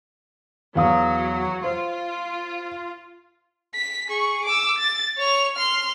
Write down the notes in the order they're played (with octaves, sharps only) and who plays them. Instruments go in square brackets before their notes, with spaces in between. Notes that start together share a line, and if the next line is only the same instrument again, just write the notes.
[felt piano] E2 F5 D#6 [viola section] F#3
[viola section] F4 [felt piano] C5
[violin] B6
G#4 C#6
D6 E6
A6
C#5 F7
C6 F6